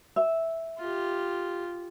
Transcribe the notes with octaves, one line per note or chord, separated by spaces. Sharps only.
E5
F4 G4